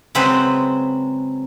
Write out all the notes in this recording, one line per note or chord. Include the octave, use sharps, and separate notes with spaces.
C#3 F#3 G#3 C4 B4 C5